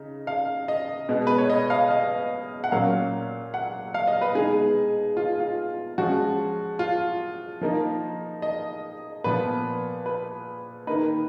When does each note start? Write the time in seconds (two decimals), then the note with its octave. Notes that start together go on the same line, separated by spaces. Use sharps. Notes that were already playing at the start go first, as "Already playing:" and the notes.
Already playing: C#3 D#4
0.27 F5
0.68 D#5
1.09 B2 G#3 B3
1.27 B4
1.38 C#5
1.50 D#5
1.70 F5
1.91 D#5
2.64 F#5
2.72 A#2 F#3 C#4 F5
3.54 F#5
3.94 F5
4.08 D#5
4.21 B4
4.35 B2 G#3 D#4 G#4
5.17 F4
5.40 F4
5.98 F3 G#3 C#4 F#4
6.79 F4
7.61 F3 A#3 D#4
8.42 D#5
9.24 A#2 F3 B3 B4
10.06 B4
10.87 D#3 A#3 D#4 B4